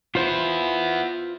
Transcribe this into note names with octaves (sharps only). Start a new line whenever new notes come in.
B3 E4 F4 C5